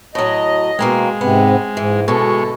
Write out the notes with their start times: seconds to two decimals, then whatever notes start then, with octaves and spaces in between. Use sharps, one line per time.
0.15 A2 F#3 D#5
0.79 B2 G#3 A#3 C4
1.21 G#2 C3 B3 C4
1.77 G#2 E3
2.08 D2 B2 G#3 A4 C#6